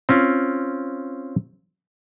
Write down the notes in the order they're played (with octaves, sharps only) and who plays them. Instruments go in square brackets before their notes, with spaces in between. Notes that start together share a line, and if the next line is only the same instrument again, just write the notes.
[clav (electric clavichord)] C4 C#4 F4